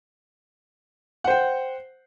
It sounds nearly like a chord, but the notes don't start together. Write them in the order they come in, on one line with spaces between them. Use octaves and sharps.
F#5 C5 G5